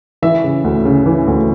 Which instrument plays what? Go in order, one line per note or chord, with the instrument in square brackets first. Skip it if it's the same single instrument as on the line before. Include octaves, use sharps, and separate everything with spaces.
[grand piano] E3 E5
C#3
D2
C#3
E3
D2